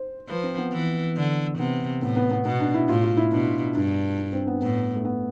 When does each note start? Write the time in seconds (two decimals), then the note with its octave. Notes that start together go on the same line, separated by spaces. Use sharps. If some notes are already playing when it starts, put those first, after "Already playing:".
Already playing: C5
0.29 F3 B4
0.43 C4
0.58 B3
0.72 E3
1.16 D3
1.58 C3 B3
2.02 A2 B3
2.16 B3
2.31 B3
2.45 B2 B3
2.60 D4
2.74 E4
2.89 A2 F4
3.03 F4
3.17 E4
3.32 B2 D4
3.75 G2 D4
4.18 D4
4.33 C4
4.47 B3
4.62 A2 B3
4.96 A3
5.05 B3